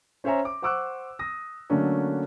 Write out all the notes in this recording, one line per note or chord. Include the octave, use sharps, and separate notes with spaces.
C#4 C5 C#5 E5 G#5 A#5
D6
C5 F#5 C#6 D6 E6 F#6
D#6 A#6
D3 F#3 A3 A#3 C#4 D4